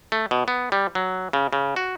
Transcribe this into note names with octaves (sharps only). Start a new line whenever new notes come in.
A3
B2
B3
G3
F#3
C#3
C#3
F#4